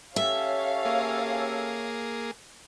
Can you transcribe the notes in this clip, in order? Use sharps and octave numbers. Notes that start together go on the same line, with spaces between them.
C#4 G4 A4 C#5 E5 F5
A#3 G#4